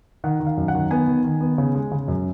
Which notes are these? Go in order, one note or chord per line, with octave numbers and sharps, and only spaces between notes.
D#3 F#5
D#3
F5
F#2
F#5
D#3
B3 G#5
D#3
D#3
B3
C#3
G#3
C#3
F#2